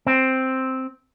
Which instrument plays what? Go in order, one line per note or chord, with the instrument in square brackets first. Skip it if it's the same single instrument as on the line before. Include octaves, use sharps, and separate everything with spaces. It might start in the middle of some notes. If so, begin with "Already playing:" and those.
[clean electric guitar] C4